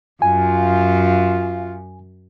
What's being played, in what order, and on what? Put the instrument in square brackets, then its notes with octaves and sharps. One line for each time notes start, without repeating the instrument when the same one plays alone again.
[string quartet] F#2 [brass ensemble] F4 [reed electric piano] G#5